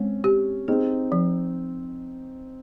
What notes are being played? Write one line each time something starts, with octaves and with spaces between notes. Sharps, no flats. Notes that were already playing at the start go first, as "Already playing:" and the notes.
Already playing: G#3 C4 C#4
G4
C4 D#4 G#4
F3